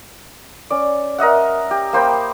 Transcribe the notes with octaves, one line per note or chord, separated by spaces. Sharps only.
C#4 D5
A#4 D#5 E5 F#5
G4
A#3 C5 G5 B5